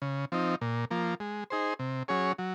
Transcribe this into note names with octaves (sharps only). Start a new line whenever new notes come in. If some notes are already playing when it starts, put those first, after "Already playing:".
C#3
F3 C4 D#4
A#2
F3 A#3
G#3
D#4 G#4 C5
C3
F#3 C#4 G#4 C#5
F#3